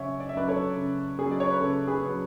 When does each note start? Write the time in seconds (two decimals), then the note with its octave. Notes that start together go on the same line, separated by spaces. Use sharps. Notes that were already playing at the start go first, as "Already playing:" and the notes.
Already playing: C#3 F#3 C#4 C#5 D5 E5 F#5 G#5
0.20 D5
0.29 E5
0.35 F#3 C#4 B4 D5
0.48 A4 C#5
0.77 C#3
1.18 F#3 C#4 G#4
1.31 D5
1.40 C#5
1.51 B4
1.60 C#3 A4
1.88 G#4 B4
2.03 F#3 C#4 B4